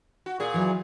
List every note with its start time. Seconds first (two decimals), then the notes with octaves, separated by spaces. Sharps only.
0.26 F#4
0.40 A#2 G#4
0.54 E3 F#3